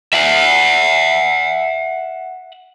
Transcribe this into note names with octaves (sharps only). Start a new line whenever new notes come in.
E5 F#5